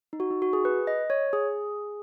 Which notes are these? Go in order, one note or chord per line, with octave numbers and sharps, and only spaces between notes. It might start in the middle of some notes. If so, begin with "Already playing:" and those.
D#4
F#4
D#4
F#4
G#4
B4
D#5
C#5
G#4